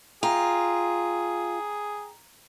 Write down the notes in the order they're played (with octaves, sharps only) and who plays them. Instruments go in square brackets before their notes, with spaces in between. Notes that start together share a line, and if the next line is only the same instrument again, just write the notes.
[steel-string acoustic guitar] F4 [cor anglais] G#4 [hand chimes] G5 A#5